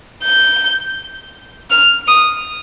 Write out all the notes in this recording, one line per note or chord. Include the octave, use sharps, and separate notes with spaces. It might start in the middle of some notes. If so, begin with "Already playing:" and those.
G6
F6
D#6